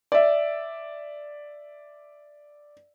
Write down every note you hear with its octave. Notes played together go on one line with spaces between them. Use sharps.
D5 E5